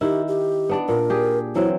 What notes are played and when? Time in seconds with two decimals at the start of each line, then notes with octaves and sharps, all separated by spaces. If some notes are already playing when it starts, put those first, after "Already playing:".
0.01 D#3 E4 G4
0.28 G4
0.69 B3 D4 D5
0.89 A#2 A#4
1.10 G4 G#4
1.55 E3 F#3 C4 E4